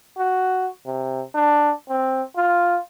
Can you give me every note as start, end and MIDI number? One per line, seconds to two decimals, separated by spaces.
0.18 0.69 66
0.86 1.22 48
1.35 1.72 62
1.89 2.22 60
2.36 2.79 65